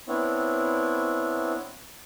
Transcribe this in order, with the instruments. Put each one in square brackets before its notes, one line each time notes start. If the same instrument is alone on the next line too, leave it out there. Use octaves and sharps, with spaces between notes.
[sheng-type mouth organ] B3 C4 D4 E4 C#5